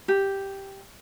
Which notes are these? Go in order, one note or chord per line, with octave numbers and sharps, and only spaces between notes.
G4